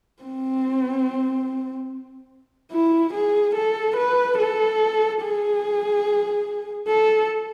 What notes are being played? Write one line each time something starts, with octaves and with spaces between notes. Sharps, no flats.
C4
E4
G#4
A4
B4
A4
G#4
A4